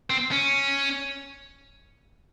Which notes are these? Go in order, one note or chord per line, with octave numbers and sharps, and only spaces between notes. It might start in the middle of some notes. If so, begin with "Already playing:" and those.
C4
C#4